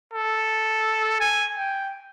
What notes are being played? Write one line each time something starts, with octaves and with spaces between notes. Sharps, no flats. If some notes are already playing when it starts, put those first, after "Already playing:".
A4
G#5
G5